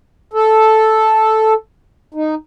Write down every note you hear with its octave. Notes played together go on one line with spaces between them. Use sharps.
A4
D#4